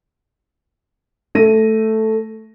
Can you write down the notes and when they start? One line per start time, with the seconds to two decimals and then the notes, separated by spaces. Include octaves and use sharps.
1.35 A3 A#6 D#7